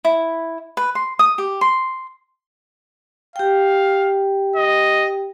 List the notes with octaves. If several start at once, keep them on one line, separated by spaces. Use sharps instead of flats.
E4
B4
C6
D#6
G4
C6
G4 F5 G5
D#5